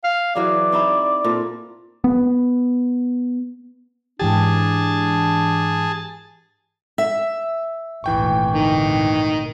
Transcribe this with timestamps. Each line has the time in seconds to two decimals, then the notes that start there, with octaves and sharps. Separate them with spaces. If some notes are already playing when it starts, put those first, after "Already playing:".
0.04 F5
0.35 E3 F#3 G#4 D5
0.72 C4 D#4 E4
1.24 A#2 C4 A4
2.04 B3
4.19 G#2 E3 D4 G4 G#4 A5
6.98 E5
8.04 G#1 D2 A#2 E3 G5 C#6
8.55 D#3